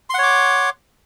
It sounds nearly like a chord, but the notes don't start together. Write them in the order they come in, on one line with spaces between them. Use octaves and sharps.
C6 F#5 C#5 D6